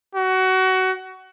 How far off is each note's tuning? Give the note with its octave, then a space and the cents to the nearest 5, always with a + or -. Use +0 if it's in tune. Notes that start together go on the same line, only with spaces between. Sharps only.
F#4 +20